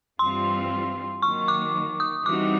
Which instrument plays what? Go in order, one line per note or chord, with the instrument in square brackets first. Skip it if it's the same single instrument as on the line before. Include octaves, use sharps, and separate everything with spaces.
[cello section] G2 E3 G3 C4 F4 [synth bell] C6
[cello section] D#3 F#3 A#3 [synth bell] C#6
[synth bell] D6
D#6
[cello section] E3 G3 C4 D#4 F#4 [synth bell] D6